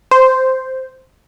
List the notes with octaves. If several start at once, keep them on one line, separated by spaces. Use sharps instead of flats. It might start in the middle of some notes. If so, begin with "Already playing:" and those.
C5